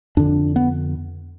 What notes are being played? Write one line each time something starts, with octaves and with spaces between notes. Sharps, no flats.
F2 D3 D4
B3